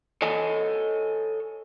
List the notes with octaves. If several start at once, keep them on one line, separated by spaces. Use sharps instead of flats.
A4 C#5 D#5 G#5